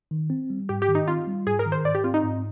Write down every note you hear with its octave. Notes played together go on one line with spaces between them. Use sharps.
D#3
C4
G3
G#2 G4
G4
D#3
D#4
C4 F4
G3
G#2 G#4
A#4
D#3
C5
G#2 D5
G4
C4 F4
D#4
G#2